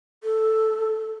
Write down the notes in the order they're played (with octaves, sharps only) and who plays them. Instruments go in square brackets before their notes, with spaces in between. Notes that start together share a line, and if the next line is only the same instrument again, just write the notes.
[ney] A4